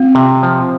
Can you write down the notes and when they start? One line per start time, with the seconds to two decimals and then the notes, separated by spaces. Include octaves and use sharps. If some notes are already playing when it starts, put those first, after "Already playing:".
Already playing: C4 F4
0.15 C3
0.43 F3